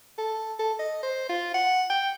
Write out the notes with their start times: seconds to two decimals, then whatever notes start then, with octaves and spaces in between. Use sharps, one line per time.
0.18 A4
0.59 A4
0.79 D#5
1.03 C5
1.29 F4
1.54 F#5
1.90 G5